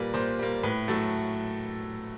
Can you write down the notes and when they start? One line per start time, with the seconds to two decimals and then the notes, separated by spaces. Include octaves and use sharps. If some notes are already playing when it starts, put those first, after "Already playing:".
Already playing: A#2 G3 A#3 B4
0.14 A#2 C5
0.39 G3 A#3
0.63 A2 B4
0.88 F#3 A3 A4